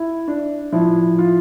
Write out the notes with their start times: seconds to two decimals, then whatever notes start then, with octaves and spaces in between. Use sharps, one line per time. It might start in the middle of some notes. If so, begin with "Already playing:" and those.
Already playing: E4
0.28 D4
0.72 A2 F3 E4
1.19 F4